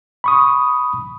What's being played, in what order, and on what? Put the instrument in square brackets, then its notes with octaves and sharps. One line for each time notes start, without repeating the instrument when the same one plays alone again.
[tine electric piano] B5 C#6 D#6